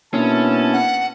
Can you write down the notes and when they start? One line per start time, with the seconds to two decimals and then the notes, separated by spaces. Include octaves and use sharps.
0.14 B2 A#3 C#4 D4 E4 A5
0.73 F#5